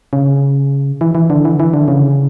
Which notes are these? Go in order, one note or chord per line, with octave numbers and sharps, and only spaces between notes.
C#3
E3
E3
D3
E3
E3
D3
C#3